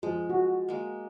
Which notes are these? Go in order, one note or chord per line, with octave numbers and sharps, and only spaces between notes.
F3 G#3
F#4
G#3 A#3